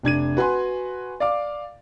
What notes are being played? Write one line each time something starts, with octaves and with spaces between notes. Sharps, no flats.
F1 D4 G#6 D#7
F#4 B4 G#5 C6
D5 F5 D6